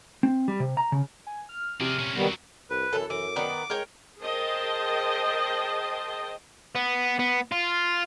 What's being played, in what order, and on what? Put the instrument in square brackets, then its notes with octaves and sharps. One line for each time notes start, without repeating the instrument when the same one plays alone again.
[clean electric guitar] C4
G3
C3
A#5
C#3
[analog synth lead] G#5
F6
[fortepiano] C3 [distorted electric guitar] G#4 D5
[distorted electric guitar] A#2 C#4
[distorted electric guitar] C#2 F#3 [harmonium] D#3 G3 B3
[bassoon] C2 [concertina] B4
[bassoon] F#2 [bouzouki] E3 A4
[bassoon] F#2 [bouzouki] E3 [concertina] D6
[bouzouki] D#3 B3 D5
[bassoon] G#3 [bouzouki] A#4 C#5 G5
[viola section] G#4 A#4 C5 D#5 G5 A5
[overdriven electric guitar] B3
B3
F4